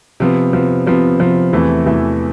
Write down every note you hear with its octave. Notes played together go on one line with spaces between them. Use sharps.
C3 F3 B3
C3 F3 B3
C3 F3 B3
C3 F3 B3
E2 C3 E3 A3 E4
E2 C3 E3 A3 E4